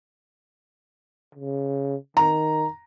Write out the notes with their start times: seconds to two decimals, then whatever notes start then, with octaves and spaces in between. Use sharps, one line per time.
1.35 C#3
2.17 D#3 A#5